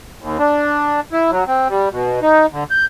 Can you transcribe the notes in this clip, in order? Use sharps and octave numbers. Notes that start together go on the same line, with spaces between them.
D#2
D4
E4
F#3
C4
G3
B2
D#4
D3
G6